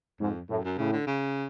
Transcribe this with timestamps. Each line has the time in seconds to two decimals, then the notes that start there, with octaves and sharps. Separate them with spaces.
0.21 F2 G#2
0.50 F#2 A2
0.64 F#2
0.78 A2 C#3
0.93 D3
1.07 C#3